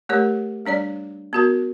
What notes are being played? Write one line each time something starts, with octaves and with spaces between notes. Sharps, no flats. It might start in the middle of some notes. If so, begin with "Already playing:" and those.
A3 G4 A#4 C#5
G3 D4 C#5 D5
B3 F#4 A#4